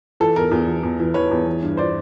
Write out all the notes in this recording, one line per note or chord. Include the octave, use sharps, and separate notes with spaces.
E3 A4
E2 A#4
E2
E3
E2
E3
E3 B4 C#5
E2
E3
G2
C5 D5